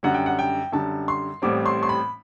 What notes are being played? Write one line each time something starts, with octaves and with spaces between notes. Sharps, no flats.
F#2 D3 G3 F#5
G5
F#5
G5
F#2 D3 G3 A5
C6
A1 A2 G3 C4 D6
C6
C6
B5